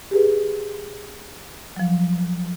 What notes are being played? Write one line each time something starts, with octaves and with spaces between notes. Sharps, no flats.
G4 G#4 B4
F3 F#3